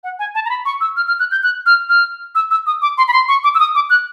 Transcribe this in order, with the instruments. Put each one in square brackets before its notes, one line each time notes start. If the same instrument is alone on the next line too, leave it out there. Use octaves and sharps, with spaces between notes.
[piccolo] F#5
G#5
A5
A#5
B5
C#6
E6
F6
F6
F#6
G6
F#6
F6
F6
E6
E6
D#6
D6
C6
B5
C6
C#6
D6
E6
D#6
D6
F#6